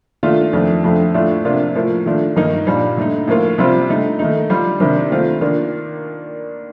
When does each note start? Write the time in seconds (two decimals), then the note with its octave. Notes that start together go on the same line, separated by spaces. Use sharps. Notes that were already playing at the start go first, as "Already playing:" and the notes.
0.23 D#3 A3 D4 F4
0.53 F2 D#3 A3 D4
0.84 F2 D3 A3
1.14 A2 A3 D4 F4
1.45 C3 F3 A#3 D4 F4
1.75 A2 F3 A#3
2.06 D#3 A3 D4 F4
2.36 G2 D#3 A#3 D#4
2.67 A#2 G3 D4
2.97 D3 A3 D#4
3.28 A2 F3 A#3 F4
3.58 C3 G3 C4 F4
3.89 D3 A3 D#4
4.19 D#3 A3 D#4
4.50 D3 G3 D4 F4
4.80 C3 D#3 G3 A#3 D4
5.11 D#3 A3 C4 F4
5.41 D#3 A#3 D4 F4